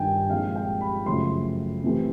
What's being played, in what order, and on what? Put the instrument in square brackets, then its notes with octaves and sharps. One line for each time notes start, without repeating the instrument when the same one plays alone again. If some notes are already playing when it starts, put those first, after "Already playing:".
Already playing: [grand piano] G2 D#3 G3 G5 G#5
A#2 F3 G#3 C4 F5
G5
B5
F#2 C#3 F3 A3 C6
C3 E3 A3 C4